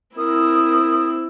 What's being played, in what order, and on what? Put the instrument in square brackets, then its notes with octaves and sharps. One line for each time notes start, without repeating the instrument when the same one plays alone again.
[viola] C4 E4 [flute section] A#4 D#6